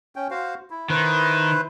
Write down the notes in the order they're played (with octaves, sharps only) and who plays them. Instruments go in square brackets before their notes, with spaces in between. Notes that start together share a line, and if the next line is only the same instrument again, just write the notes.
[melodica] C#4 G5
F#4 C5 F5
E4
[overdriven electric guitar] D#3 [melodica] E4 B4 C5